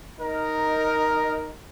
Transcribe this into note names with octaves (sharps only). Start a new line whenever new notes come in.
D#4 A#4